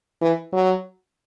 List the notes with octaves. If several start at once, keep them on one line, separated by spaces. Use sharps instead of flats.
E3
F#3